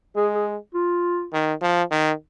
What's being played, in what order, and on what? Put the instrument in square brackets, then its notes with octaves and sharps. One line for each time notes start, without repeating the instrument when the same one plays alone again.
[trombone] G#3 [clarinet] G#4
[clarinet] G#4
F4
[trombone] D#3
F3
D#3